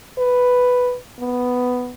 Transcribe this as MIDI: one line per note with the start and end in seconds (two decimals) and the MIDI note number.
0.18 0.96 71
1.20 1.94 59